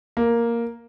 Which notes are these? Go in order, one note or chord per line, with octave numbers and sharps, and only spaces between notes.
A#3